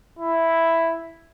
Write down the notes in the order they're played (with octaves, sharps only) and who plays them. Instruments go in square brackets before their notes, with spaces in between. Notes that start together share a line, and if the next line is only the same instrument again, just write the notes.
[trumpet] E4